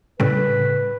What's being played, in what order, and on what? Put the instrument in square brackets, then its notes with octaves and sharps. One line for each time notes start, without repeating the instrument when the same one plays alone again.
[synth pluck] A2 C#3 G3 [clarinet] B4